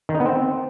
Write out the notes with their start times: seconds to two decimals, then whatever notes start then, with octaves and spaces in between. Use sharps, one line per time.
0.09 D#3
0.15 D#4
0.20 B3
0.26 C4